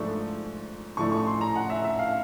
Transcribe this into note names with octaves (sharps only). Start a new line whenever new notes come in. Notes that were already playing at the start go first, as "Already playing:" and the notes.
Already playing: G#2 F3 A3 D4 C#6
A2 F3 A3 D4 C#6
C#6
C6
A#5
F#5
E5
E5
F5